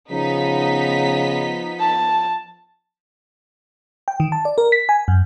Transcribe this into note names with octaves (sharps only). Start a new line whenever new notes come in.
C#3 F3 B3 D#4 B6
A5
G5
D#3
A5
D5
A#4
B6
G#5
F#2